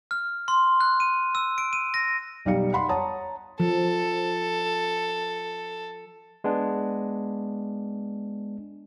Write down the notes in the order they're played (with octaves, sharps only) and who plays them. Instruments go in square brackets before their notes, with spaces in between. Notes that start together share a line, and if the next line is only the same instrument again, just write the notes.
[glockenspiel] F6
C6
F#6
D#7
E6
D7
D#7
A#6
[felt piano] B1 G3 D#4 F5 C#7
F5 F#5 B5 C6
C#5 F#5 A5 A#5 D#6
[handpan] F3 [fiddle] A4
[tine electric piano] G#3 B3 D4